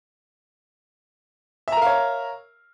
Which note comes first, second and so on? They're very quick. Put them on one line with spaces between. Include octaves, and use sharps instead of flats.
E5 A#5 A#4 F5 C#5